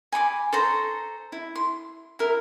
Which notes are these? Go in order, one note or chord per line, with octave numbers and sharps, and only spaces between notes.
G#5 B5 C#6 D6
A4 C5 A#5 C#6
E4
C6
E4 A#4